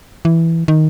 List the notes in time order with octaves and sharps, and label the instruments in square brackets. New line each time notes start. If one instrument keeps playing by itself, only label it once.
[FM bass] E3
D#3